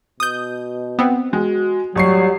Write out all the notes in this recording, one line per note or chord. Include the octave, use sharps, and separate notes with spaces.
B2 D#6 G6
B3 C4
G#3 F#4
A1 F#3 G3 C#6 C7